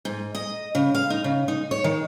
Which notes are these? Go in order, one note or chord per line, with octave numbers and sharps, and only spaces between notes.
G#2
D#5
C#3
F5
D#4
C#3
D#4
C#5
D#3